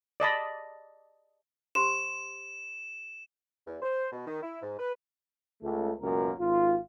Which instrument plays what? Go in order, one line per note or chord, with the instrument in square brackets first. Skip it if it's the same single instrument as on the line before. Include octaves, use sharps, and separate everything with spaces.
[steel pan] D5 D#5 A5 B5
[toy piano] G4 C5 C6 [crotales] E7
[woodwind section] E2
C5
B2
D#3
E4
G#2
B4
[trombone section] C#2 A3
C#2 F#2 B2 A#3 A#4
G#1 F4